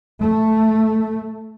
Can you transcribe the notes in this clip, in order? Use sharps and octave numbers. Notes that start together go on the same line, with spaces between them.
A3